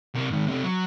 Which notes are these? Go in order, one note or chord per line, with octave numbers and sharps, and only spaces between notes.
C3 A#4
G#2 D#3
C3 A3
F#3